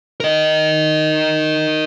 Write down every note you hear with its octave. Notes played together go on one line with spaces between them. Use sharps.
A#4 D#5